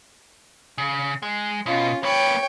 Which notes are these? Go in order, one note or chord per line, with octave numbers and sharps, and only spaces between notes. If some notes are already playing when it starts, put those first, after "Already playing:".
C#3
G#3
B2 C#4 F4
A#3 B4 C#5 G5